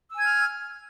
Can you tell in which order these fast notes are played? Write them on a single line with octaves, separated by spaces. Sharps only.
E6 G#5 G#6 F6